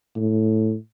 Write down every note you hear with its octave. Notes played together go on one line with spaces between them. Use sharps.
A2